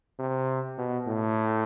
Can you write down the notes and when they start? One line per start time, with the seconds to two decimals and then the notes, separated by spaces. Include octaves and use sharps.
0.19 C3
0.78 B2
1.07 A2